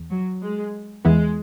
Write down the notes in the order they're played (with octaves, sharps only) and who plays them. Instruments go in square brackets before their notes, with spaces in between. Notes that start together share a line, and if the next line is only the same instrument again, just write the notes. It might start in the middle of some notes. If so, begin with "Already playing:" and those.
Already playing: [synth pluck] E2
[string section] F#3
G#3
[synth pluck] E2 E3 B3 E4 [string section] G#3